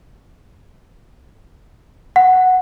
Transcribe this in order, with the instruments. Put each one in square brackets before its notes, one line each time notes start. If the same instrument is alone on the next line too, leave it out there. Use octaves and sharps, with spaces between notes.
[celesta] F#5